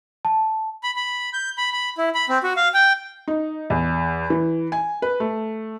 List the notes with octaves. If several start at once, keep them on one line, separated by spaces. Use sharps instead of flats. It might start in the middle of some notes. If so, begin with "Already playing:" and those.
A5
B5
B5
G6
B5
B5
E4
B5
C4
F#4
F5
G5
D#4
E2
E3
G#5
B4
A3